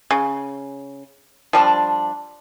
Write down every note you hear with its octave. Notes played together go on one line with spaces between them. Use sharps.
C#3
F3 G3 D4